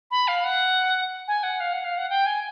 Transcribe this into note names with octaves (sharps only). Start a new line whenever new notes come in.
B5
F5
F#5
G#5
F#5
F5
F#5
F5
F#5
G5
G#5